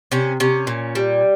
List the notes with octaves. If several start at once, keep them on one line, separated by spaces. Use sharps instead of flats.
C3 C#4
C3 C#4
A#2
G3